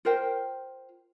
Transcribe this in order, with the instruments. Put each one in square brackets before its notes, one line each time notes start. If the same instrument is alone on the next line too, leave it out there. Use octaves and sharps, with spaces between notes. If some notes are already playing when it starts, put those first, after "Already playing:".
[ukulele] F4 A#4 C5 G5